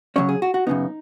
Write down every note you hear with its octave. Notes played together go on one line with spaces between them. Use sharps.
C#3 F#3 C#4 C#5
G#4
F#4
F#4
F#2 C#3 B3 D#4